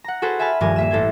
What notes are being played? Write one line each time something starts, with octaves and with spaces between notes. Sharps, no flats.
F#5 A#5
F#4 G#4 A4 B4 C5
E5 G#5 A5 B5 F6
D#1 G2 F3 G4 A#4 G#5
A#3 E5 E7
A1 A4 C5 G#6